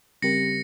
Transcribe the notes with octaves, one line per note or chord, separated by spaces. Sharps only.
C#3 G3 C4 G4 A#4 A#6 C#7